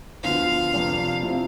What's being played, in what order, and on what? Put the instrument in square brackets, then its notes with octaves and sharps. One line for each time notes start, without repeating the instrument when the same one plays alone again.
[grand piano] D2 D3 F3 B3 F4 [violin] F5
[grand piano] F2 C3 G3 D4 F4
C3 F3 C4 E4